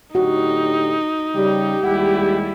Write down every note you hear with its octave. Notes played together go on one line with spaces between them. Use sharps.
A2 D3 D#4 F#4 G4
C#3 G3 G4
D#2 G3 G#3 E4 F#5